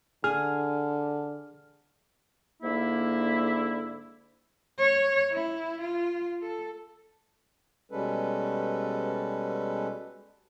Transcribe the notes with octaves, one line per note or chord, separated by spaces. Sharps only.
D3 G#4 F6
G#2 D3 A#3 E4
C#5
E4
F4
A4
B2 G3 G#3 C#4 A4 B4